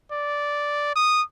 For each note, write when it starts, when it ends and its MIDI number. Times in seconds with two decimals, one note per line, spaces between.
0.12 0.91 74
0.96 1.22 87